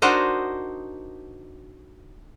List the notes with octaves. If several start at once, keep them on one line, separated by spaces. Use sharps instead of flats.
D4 D#4 F#4 A#4 C5 D#5